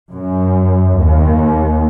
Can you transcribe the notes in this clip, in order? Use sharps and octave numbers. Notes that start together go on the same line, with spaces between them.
F#2
D#2